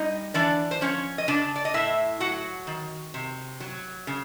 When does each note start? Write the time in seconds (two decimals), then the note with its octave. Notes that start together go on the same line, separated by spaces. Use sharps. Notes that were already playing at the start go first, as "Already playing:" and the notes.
Already playing: G3 D#4 D#5
0.34 E3 D4 D5
0.71 C5
0.81 F3 C#4 C#5
1.18 D#5
1.28 C#3 D4 D5
1.56 D5
1.65 D#5
1.74 A2 E4 E5
2.20 F#3 F#4 F#5
2.67 D#3
3.14 C3
3.60 F#3
4.07 C#3